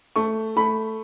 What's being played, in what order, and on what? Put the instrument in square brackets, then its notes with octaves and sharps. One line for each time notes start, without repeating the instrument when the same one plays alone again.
[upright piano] A3 C#6
A3 B5